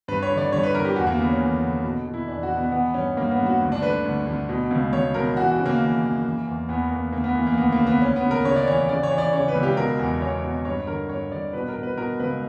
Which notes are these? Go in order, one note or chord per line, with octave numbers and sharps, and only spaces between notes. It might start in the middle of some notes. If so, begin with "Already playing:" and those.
G2 B4
C#5
D3
D5
G2 C#5
B4
D3 A#4
G4
E2 F#4
A#3
D3 B3
C#4
E2
D3
B2
B2
E4
E2 D4
F#4
B2
B3
E3 B3
G2 C#4
G2 A#3
B3
G2
F#4
D2
D4
D3 B4
D2
D2
B2
C#2
C#2 C#5
B2 A#4
E3 F#4
F#4
C#3
A#3
E3
F#2
E3
E2
E2 B3
E2 A#3
D2 A#3
B3
E3 A#3
A#3
D2 B3
A#3
C#3
B3
D2 C#4
B3
C#3
A#4
C#3 C#5
D5
E3 C#5
C#3 D5
C#5
E3
D5
C#3 C#5
B4
C#2
G4
B2 A#4
E2
E2 C#5
B2
G2 C#5
D3 A#4
G2 C#5
G2 D5
B2 B4
A#4
B2
B4
B2 A#4
C#2 B4